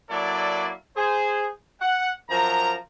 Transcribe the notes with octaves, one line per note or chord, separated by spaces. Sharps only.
F#3 A#3 E4 A4 D5
G#4 C5
F#5
F#2 F3 A#4 A#5